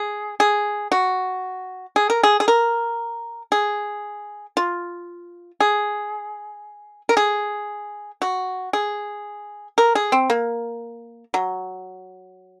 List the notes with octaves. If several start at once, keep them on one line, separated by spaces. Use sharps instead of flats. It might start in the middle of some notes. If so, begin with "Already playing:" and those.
Already playing: G#4
G#4
F#4
G#4
A#4
G#4
G#4
A#4
G#4
F4
G#4
A#4
G#4
F#4
G#4
A#4
G#4
C4
A#3
F#3